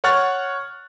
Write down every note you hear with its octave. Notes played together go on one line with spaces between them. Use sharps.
C#5 F#5 C#6 F6 F#6 A6